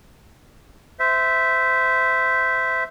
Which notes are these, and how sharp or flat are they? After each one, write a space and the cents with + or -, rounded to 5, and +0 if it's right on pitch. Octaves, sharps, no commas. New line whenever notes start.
C5 -20 E5 +0